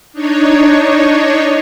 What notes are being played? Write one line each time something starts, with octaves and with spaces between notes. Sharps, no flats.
D4 D#4 C#5